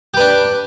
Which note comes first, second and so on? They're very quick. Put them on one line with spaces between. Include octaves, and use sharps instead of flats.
G4 B4 D4